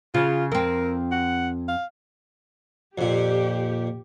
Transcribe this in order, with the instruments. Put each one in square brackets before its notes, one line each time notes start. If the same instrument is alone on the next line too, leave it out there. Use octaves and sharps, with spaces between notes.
[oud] C#3 [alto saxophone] F4
[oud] F2 C4 [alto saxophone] A#4
[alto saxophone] F#5
F5
[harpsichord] F2 A#2 [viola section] G4